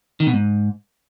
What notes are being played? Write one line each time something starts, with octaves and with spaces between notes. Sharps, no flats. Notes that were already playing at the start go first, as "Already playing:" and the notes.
D#3
B2
G#2